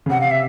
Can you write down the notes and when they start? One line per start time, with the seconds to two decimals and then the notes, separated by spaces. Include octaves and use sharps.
0.06 C#3
0.10 C3 F#5
0.21 F5
0.31 E5